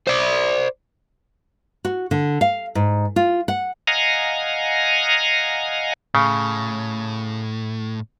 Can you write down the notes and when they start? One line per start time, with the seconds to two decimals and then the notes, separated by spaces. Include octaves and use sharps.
0.07 C5 D5
1.85 F#4
2.11 D3
2.41 F5
2.75 G#2
3.16 F4
3.48 F#5
3.87 D#5 F5 F#5 G#5 A#5
6.15 A2 C#3